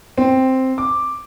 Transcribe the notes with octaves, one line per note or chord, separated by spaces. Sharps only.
C4
D6